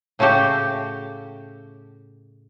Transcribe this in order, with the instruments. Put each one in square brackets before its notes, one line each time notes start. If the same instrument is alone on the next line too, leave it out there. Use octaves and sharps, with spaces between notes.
[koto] A2 C#3 A3 F#4 G4